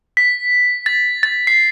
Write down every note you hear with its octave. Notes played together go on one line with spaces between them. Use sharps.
B6
A6
A6
C7